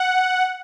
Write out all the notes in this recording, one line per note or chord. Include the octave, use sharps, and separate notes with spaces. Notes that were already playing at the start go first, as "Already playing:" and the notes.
Already playing: F#5